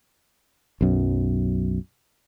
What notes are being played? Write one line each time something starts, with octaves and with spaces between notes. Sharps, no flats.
B1 F#2